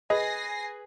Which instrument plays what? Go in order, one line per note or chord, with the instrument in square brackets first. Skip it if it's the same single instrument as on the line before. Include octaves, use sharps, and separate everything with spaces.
[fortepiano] G#4 B4 [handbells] D#5 [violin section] G#5 A#6 C7